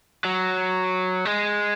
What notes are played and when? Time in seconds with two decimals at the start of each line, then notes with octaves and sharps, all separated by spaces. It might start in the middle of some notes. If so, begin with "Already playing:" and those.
0.25 F#3
1.25 G#3